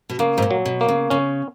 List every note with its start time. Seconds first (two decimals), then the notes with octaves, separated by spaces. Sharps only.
0.09 B2
0.19 C#3 A#3
0.38 G#2
0.42 A#2
0.51 F#3
0.65 B2
0.81 A#3
0.88 C#3
1.10 C#3 C#4